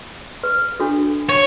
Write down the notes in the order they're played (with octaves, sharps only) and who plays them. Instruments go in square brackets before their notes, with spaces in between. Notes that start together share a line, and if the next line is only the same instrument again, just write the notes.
[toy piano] B4
D4 F#4 A4
[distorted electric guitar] C#5